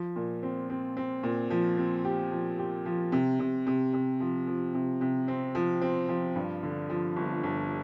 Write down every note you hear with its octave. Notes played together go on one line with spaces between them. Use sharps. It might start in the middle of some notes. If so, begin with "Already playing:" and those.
Already playing: F3
A#2
C4
C4
C4
A#2
F3
C4
G4
F3
G4
F3
C3
C3
C3
C3
F3
F3
C3
C3
C4
F3
C4
F3
G2
D3
F3
G1
G1